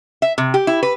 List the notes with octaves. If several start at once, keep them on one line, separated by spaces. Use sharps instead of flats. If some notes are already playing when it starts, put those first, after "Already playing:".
E5
C3
G4
E4
B4